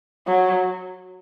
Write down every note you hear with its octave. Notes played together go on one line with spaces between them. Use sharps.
F#3